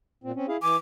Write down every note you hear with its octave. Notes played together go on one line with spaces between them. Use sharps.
A#2 C4
C4 C#4
E4 G#4 F5
E3 G#5 D6